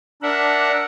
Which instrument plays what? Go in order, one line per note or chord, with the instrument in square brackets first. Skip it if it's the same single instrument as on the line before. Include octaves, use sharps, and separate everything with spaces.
[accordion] D4 [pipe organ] A#4 E5 F#5